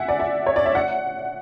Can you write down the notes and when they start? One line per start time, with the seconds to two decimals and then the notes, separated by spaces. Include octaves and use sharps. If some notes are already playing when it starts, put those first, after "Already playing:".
Already playing: E5 F#5 G#5
0.08 D5
0.20 E5
0.46 C#5
0.56 D5
0.66 E5
0.75 F#5